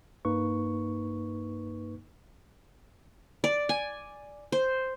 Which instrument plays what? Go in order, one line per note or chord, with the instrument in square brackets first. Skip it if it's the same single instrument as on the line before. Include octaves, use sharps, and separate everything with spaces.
[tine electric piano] G2 A#3 D#4 B4 C#6
[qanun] D5
G#5
C5